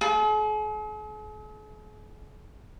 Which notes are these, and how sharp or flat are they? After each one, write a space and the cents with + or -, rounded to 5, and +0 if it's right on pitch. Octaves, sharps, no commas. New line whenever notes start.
G#4 +45